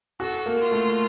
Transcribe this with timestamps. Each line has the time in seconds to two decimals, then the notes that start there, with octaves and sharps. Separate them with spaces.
0.20 F#4 A4
0.46 A#3
0.59 F4
0.71 A3